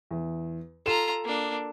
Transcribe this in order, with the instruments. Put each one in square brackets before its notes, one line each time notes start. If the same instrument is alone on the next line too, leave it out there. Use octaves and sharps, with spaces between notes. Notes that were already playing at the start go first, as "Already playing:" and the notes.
[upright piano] E2
[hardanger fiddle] F4 A#5 [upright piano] A4 E7
[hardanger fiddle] A#3 D4